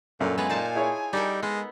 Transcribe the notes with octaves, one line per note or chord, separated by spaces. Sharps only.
F#2 A#2 A4
G#3 B3 F4 G#5
A#2 D#4 C5 A5
E4 G#4 C#5
G3 D#4 A4 A#4
G#3 B3